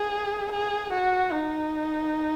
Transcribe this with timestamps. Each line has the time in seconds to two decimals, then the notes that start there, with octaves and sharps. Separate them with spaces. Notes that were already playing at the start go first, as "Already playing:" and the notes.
Already playing: G#4
0.52 G#4
0.93 F#4
1.32 D#4